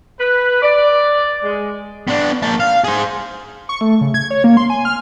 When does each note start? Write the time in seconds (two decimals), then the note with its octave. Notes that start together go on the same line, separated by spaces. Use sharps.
0.19 B4
0.62 D5
1.44 G#3
2.08 B3 D4
2.43 A#3 A5
2.60 F5
2.84 G#4 C5
3.69 C#6
3.81 A3
4.01 C#3
4.14 G#6
4.31 C#5
4.44 A#3
4.57 C6
4.70 G#5
4.85 F6